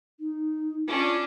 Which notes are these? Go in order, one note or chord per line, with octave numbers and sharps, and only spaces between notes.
D#4
C#4 D4 F4